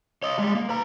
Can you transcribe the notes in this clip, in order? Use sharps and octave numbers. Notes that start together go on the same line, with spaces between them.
C#5 D#5
G3 G#3
A#3
B4 A#5